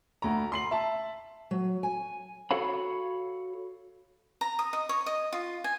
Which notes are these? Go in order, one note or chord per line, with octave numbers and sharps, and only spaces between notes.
D2 A#5
C6 C7 F#7
E5 A5
F#3
G#5
F#4 A4 C#5 F5 B5
A#5
D#6
D#5
C#5
D#5
F4
G#5